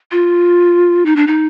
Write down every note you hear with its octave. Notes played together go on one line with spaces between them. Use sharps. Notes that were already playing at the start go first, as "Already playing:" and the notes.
F4
D#4
D4
D#4